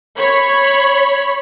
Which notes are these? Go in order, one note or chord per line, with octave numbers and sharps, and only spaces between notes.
C#5 B5